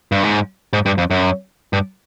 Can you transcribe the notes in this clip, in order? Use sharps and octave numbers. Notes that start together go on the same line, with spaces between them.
G2
G#2
G#2
G2
F2
F#2
G2